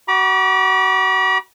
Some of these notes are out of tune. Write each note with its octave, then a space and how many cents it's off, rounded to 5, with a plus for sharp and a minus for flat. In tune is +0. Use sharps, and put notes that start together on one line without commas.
F#4 +30 B5 -40 D6 +0